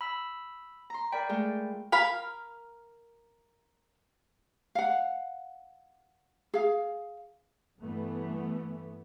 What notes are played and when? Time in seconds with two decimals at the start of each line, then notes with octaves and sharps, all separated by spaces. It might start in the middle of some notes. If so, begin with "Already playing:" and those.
0.01 B5 E6
0.90 A#5 C6
1.12 A#4 D5 G5 B5
1.29 G#3 A3 F4
1.92 A#4 F5 B5
4.75 F5 F#5
6.54 G#4 F5
7.79 G2 E3 A3 B3